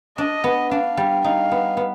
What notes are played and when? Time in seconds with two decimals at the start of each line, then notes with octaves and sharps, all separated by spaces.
0.18 D4 D#5
0.44 B3
0.71 D4 F5
0.97 G3
1.24 D#4 F5
1.51 B3
1.77 B3